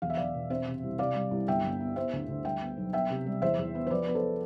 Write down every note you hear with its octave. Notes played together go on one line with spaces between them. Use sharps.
E1 F5
E5
E1 D5 F5
B2
C4 C5 E5
C3
C2
C3 D5 F5
G3
C2
G1 E5 G5
G1
B3
B3 C5 E5
D2
D2
G3 E5 G5
B3
B1
B3 E5 G5
C3
G3
E2 C5 E5
E2
B3
C5
F3 B4 D5
B3 B4
A4 C5